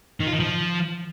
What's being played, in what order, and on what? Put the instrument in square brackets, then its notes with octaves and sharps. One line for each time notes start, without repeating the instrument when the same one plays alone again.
[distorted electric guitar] D#3
F4
D#3
F3